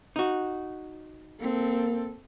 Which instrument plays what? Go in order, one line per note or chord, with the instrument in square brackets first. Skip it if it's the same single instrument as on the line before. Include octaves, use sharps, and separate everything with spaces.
[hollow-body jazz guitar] D#4 F#4
[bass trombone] A#3 [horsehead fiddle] C4 A4